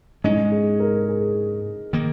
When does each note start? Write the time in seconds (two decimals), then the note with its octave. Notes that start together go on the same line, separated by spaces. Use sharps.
0.24 G#2 G#3 C#4 D#4
0.52 G#4
0.80 A#4
1.09 G#4
1.93 D#3 A#3